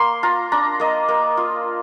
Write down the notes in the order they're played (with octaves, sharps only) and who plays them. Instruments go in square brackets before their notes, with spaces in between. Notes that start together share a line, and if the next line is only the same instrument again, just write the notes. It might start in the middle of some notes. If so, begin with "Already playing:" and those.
Already playing: [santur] A#3 C6
F4 A#5
D4 A#5
A#3 D#5
A#3
F4